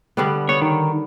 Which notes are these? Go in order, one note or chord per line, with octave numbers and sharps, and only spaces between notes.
D3 G3 B3
B3 C#5
D#3